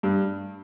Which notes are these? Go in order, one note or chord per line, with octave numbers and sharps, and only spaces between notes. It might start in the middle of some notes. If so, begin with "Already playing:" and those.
G2